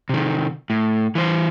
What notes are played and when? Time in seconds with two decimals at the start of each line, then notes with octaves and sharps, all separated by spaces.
0.09 C3 D#3
0.70 A2
1.15 E3 C5